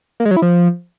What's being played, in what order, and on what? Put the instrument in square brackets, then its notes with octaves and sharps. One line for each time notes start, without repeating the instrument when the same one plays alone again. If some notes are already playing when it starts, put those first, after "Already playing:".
[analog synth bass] A#3
G#3
F#3
E4
F3